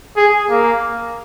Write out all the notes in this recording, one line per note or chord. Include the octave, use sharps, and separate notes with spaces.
G#4
A#3